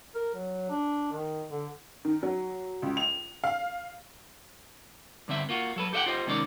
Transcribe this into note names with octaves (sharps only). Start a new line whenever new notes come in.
A#4
F#3
D4
D#3
D3
D#3
F#3
C#2
F7
F5
G2 D3 C4 E5
A#3 F4 F#4
F#3 A4 B4
G4 A4 D#5 E5 F#5 G5
F4 G4 C5 D#5
C3 D#3 G#3 C#4 A#4 D5